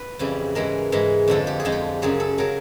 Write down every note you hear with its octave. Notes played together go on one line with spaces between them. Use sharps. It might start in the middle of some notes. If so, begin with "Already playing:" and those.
Already playing: B4
F2 C#3 E3 G3
G#2 E3 G#3 A#4
G#2 E3 G#3
F2 D3 F3 G#3 A4
G4
G#4
F2 D3 F3 G#3
G4
F#2 C#3 F#3 G#4
A4
C#3 F#3 A#4